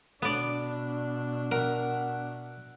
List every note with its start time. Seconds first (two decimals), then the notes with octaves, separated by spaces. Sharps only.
0.22 B2 B3 D4 D5
1.52 A#4 E5 F#5